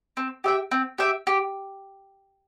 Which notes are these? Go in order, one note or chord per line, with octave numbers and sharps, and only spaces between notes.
C4
G4 E5 G5
C4
G4 E5 G5
G4